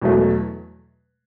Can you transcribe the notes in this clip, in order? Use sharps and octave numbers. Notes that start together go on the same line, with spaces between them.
E2 B2 F#3 A3